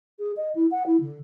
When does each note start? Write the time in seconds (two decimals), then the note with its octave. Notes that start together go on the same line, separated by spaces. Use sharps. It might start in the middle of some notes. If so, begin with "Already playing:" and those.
0.19 G#4
0.37 D#5
0.55 E4
0.71 F#5
0.86 E4
1.00 D3